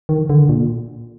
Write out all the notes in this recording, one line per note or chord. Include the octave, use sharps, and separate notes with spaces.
D#3
D3
A#2